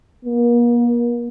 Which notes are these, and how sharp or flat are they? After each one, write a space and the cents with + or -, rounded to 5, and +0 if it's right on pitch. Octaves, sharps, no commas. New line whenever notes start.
A#3 +40